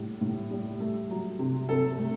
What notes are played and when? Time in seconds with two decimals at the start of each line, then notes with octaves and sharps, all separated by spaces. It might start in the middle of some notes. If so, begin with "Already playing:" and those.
Already playing: A2 G3
0.21 A2
0.51 G3
0.80 A3
1.10 F#3
1.39 C3
1.69 C3 A4
1.98 A3